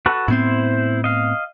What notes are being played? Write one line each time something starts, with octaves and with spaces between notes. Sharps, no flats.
F#4 A4 B4
A2 B3 C4 E4 C5
D#5 F5